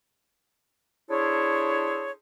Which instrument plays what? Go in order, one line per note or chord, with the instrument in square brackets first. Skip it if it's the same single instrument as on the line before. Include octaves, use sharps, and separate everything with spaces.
[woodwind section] D4 E4 G#4 A4 C5 C#5